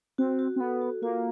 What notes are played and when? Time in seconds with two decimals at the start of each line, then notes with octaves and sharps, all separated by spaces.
0.18 C4 F#4
0.39 F#4
0.56 C4
0.60 B3 A4
0.82 F#4
1.02 A#3 F4